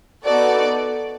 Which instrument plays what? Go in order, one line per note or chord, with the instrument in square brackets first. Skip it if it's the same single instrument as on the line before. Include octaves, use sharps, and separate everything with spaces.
[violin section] B3 D#4 F#4 A4 D5